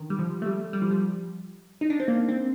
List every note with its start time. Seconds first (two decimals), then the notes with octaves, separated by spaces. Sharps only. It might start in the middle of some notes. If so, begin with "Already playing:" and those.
Already playing: D3 D#3
0.10 G3
0.19 F3
0.42 A3
0.46 G3
0.73 G3
0.82 F3
0.91 G3
1.81 D#4
1.90 D4
2.00 C4
2.08 A#3
2.29 C4